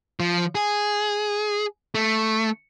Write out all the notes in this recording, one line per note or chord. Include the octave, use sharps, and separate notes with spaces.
F3
G#4
A3